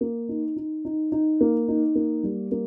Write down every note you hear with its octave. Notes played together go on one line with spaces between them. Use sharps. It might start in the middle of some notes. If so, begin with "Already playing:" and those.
A#3
D#4
D#4
D#4
D#4
A#3
D#4
A#3
G3
A#3